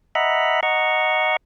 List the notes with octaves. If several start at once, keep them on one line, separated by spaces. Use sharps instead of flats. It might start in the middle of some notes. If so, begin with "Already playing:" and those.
D#5 E5 F#5 A#5 B5
D#5 F#5 A#5 C#6